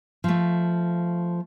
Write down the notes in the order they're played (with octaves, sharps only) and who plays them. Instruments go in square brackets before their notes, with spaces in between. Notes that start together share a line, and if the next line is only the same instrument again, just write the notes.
[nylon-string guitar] F3 A3